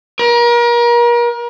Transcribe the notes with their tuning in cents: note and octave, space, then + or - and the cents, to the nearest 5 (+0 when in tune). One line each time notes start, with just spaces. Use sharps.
A#4 +35